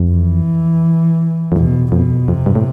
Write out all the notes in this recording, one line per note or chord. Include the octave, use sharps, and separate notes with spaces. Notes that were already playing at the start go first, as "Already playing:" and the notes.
Already playing: F2
E3
F2
E2 B2
F2 B2
F2 C3
G2
A2